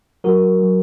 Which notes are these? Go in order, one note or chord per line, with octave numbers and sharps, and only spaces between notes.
F#3 F#4 A#4
F#3